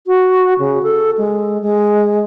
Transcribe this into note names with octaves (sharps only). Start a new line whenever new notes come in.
F#4
C#3
A4
G#3
G#3